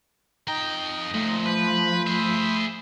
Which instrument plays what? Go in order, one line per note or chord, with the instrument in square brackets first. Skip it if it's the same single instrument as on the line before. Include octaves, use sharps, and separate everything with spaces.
[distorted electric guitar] F2 G5 [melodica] D#4 A#5
[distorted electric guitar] F2 A#2 [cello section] F3 [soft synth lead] A3
[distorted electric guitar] B4 [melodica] C5 B5
[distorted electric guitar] G#4 E5